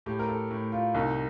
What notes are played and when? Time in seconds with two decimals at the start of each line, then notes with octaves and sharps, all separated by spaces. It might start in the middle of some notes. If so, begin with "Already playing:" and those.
0.06 A2 G4
0.19 A#4
0.29 A4
0.51 A2
0.72 F4
0.94 C2 D#4